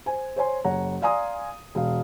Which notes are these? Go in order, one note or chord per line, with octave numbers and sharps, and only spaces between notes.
C5 G#5
C5 C#5 G#5 C6
F#1 C#5 F#5 A#5
D5 F5 G#5 A#5 C6 D#6
E1 F5